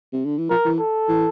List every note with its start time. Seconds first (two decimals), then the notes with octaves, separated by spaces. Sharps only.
0.13 C3
0.25 D3
0.38 E3
0.50 F3 A#4
0.65 E3
0.79 A4
1.08 E3